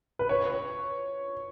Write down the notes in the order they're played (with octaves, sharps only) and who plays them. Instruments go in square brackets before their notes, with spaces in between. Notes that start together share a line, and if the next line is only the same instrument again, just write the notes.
[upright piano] B4
C#5